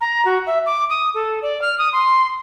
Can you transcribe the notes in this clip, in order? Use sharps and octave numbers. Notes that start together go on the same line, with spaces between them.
A#5
F#4
E5
D6
D#6
A4
D5
F6
D#6
C6